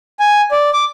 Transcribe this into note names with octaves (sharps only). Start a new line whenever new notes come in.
G#5
D5
D6